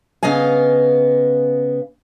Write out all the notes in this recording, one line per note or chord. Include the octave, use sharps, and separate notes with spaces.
C#3 B3 D#5 F5 G#5